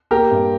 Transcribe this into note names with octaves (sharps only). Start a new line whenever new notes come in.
A#3 G4 A#4
G2